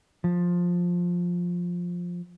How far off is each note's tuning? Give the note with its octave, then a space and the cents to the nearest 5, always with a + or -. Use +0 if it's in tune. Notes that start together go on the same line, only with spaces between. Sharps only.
F3 +10